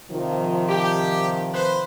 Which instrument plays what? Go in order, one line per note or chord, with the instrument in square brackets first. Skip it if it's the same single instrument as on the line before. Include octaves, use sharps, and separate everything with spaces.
[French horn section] C3 D#3 F3
[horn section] G4
B4 C5